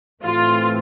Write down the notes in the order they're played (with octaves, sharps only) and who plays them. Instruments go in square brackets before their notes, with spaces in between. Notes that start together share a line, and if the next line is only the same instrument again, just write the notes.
[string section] A2 E3 A3 C4 [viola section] F4